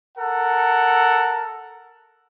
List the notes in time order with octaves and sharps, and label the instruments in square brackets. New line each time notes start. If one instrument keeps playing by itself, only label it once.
[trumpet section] A4 A#4 F#5